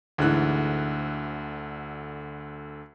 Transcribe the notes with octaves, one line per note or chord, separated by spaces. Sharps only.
D2 G#2 D3 E3 F#6